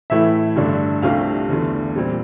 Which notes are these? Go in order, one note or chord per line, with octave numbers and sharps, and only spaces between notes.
A2 E3 A3 E4 E5
G2 D3 A3 D4
C2 C3 F3 A3 D4 F5
E2 D3 A3
A#2 G3 C4